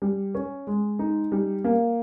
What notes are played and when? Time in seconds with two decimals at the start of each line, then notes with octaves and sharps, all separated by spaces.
0.02 G3
0.35 C#4
0.67 G#3
0.99 D#4
1.32 G3
1.64 A#3